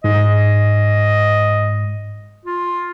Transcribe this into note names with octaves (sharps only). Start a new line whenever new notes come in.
G#2 D#5
F4